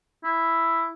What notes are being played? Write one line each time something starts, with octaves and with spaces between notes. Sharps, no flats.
E4